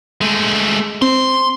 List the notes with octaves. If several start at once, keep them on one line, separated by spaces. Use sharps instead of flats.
G#3 A3
C4 C6